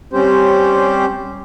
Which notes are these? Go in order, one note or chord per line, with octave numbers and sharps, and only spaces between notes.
G3 C4 C#4 G4 C5